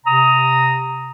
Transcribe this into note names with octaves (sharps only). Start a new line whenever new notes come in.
C3 A#5 D#6